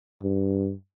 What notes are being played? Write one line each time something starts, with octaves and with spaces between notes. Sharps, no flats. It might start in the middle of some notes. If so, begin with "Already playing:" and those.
G2